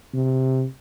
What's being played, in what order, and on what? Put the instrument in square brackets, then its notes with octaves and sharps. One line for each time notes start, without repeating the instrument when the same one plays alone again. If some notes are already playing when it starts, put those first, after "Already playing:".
[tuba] C3